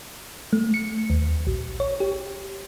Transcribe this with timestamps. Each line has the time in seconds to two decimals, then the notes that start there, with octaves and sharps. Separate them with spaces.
0.53 A3
0.74 C#7
1.10 D#2
1.47 A#1
1.80 C#5
2.00 G4